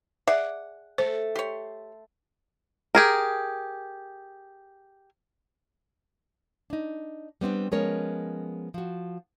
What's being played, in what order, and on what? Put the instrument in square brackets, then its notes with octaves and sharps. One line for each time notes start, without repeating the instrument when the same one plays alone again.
[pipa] G#4 D5 F#5 [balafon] E5
[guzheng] A3 [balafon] C5
[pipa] G4 C#5 [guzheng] C6
[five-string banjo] G4 G#4 A#4
[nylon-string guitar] D4 D#4
G3 B3 C4 D4
F3 G#3 B3 C#4 A#4 C#5
F3 F#4